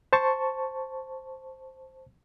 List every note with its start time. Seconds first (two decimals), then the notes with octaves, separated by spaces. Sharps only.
0.13 C5 A5 C#6